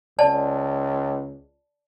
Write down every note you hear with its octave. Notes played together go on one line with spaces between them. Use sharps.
C#2 D5 A5